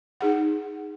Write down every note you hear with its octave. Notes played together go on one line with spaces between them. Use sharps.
D#4 G#4 F#5